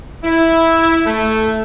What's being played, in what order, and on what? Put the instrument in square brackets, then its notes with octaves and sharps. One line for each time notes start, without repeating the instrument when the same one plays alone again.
[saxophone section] E4
A3